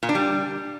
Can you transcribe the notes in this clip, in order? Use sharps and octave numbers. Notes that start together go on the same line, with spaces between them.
A#2
D4
G3